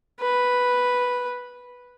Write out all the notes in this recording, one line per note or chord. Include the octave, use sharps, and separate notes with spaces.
B4